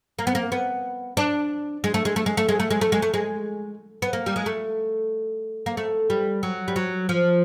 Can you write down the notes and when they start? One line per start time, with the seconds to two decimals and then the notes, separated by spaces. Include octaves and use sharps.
0.19 A#3
0.27 B3
0.35 A#3
0.52 B3
1.17 D4
1.84 G#3
1.94 A3
2.05 G#3
2.16 A3
2.26 G#3
2.37 A3
2.49 G#3
2.60 A3
2.71 G#3
2.81 A3
2.92 G#3
3.02 A3
3.14 G#3
4.02 B3
4.13 A#3
4.26 G3
4.36 G#3
4.46 A3
5.66 A#3
5.77 A3
6.10 G3
6.43 F#3
6.68 G3
6.76 F#3
7.09 F3